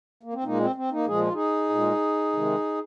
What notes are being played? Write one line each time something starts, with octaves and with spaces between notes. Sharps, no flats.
A#3
C4
A#2 G#3 A#3 D#4
C4
C4
A#3 D#4
A#2 F3 G#3 G#4
F4
D#4 G#4
A#2
G#3
C3 D#3 G#3